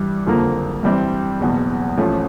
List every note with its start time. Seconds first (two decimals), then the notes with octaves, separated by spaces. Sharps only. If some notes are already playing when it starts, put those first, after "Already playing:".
Already playing: G2 E3 G3
0.26 F#1 F2 D3 F3 A#3
0.83 G2 E3 G3 C4 E4
1.40 F#1 E2 B2
1.97 A1 A2 F3 A3 C#4